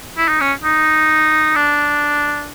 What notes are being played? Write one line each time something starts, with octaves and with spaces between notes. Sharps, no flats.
E4
D#4
C#4
D#4
D4